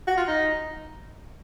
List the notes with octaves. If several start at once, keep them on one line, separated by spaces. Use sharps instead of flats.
F#4
F4
D#4